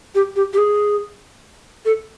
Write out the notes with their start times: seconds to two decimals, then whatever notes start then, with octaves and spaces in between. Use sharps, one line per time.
0.15 G4
0.36 G4
0.53 G4
0.58 G#4
1.85 A4